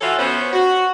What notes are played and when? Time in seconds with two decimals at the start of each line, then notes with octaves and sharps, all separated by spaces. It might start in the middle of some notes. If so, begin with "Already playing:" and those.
0.01 E3 F4 F#4 A4 C#5 E5
0.18 B3 C#4 C5
0.53 F#4